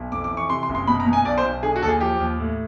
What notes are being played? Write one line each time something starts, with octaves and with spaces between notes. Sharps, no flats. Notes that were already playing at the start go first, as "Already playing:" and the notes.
Already playing: B1
F2 D6
D6
E3
C#6
C3 C6
C6
F#1
C6
B2 B5
A#5
B2
G#5
B1 D5
C5
B1
D3 G#4
F#4
D#2 A4
G#4
F3 G4
D#2
A2